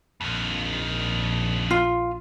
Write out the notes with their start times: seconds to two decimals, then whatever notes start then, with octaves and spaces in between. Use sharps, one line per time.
0.21 A#1 F2 D#3
1.71 F4